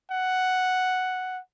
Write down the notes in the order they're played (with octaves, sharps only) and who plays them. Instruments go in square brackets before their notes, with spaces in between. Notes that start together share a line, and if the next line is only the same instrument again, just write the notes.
[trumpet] F#5